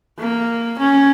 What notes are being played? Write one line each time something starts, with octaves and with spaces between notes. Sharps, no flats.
A#3
C#4